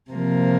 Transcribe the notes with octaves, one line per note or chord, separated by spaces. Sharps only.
C3 F3 A#3